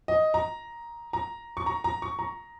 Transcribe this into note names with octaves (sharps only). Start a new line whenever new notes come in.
D#5
A#5
A#5
C#6
A#5
A#5
C#6
A#5